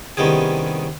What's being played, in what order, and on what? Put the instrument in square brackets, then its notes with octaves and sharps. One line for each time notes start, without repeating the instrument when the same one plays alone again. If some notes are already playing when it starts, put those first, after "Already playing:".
[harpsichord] C2 D#3 B3 C#4 G4 G#4